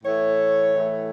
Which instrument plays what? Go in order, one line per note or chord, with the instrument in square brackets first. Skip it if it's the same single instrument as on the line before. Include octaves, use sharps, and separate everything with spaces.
[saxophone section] A2 E3 A3 C#5
A2 E3 A3